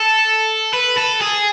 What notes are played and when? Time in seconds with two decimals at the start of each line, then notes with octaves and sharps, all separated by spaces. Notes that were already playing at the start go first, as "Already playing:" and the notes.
Already playing: A4
0.74 B4
0.98 A4
1.22 G#4